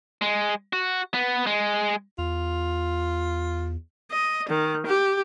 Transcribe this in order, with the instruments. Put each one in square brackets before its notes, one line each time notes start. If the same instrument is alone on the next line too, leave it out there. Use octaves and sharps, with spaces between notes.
[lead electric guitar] G#3
F#4
B3
G#3
[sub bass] E2 [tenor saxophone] F4
[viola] D#5
D#3
G4